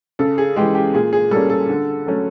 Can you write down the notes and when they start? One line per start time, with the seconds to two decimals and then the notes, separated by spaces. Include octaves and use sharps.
0.19 C#3 A4
0.38 G#4
0.56 E3 G#3 G4
0.75 G4
0.94 A#2 G#4
1.13 G#4
1.31 G3 A#3 C#4 A4
1.50 A4
1.69 D3
2.07 F#3 A3 C#4